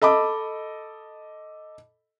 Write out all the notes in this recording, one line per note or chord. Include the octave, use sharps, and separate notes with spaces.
A4 D#5 B5 D6